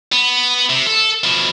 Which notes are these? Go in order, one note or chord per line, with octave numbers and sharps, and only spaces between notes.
B3
C3
A4
B2 F3